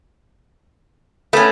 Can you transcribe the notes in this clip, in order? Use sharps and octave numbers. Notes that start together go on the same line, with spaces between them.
A3 B3 C#4